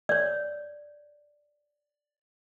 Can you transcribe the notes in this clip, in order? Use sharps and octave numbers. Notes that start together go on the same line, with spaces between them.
C#5 D5